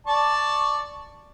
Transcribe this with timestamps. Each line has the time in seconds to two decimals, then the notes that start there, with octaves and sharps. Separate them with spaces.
0.07 D5 A5 C#6